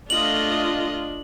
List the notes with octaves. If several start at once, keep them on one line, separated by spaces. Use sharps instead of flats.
A3 D4 F4 D#5 F#7